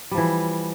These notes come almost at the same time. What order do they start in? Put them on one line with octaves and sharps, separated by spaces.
G3 F3 E3